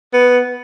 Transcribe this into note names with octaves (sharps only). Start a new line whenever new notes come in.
B3